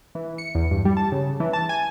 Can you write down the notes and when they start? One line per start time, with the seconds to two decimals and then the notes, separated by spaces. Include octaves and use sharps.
0.15 E3
0.38 C#7
0.55 E2
0.71 G2
0.85 G3
0.97 A5
1.12 C#3
1.40 E3
1.53 A5
1.69 G#5